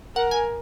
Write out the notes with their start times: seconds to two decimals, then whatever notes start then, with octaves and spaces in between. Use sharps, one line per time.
0.16 A#4 F#5
0.31 G#5